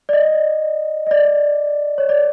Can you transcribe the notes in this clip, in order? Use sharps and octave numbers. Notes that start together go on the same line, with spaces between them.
D5
D#5
D#5
D5
C#5
D5